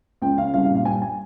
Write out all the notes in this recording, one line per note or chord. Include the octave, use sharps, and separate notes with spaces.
C#2 G5
C#3 F5
C2 F5
F5
A#2
F5
G2 G#5
G#5